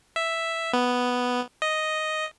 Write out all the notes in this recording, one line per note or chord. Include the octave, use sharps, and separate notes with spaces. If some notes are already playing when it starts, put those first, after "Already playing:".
E5
B3
D#5